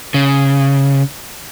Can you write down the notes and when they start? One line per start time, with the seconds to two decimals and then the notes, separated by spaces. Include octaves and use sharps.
0.14 C#3